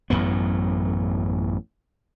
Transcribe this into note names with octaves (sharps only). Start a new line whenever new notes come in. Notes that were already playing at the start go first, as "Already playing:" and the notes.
A1 F#2 A2 B3